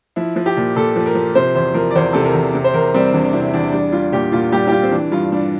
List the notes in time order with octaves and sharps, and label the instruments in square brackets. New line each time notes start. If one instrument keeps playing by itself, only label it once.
[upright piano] F3 E4
F3
G4
A#2
A#2 A4
F3
A#4
F3
C3 C5
E2 C5
F3 A#4
D5
E2 C5
C3 A4
A#4
E2
C3
C5
E2 A#4
G3 C4
E2 D4
C3 E4
E2 D4
G3 D4
G3 F4
A#2 G4
A#2 F4
G3 G4
G4
G3 F4
C4
E3 D4
G2 F4
G3 D4